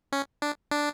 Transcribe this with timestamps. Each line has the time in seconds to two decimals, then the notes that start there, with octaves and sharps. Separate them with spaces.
0.12 C#4
0.42 D4
0.71 D4